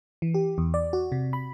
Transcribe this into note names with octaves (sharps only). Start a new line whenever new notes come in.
E3
G4
E2
D5
F#4
C3
B5